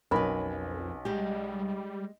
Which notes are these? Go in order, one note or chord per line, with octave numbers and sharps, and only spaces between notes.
B1 F2 C#4 A#4 B4 B5
G3 G#3 G4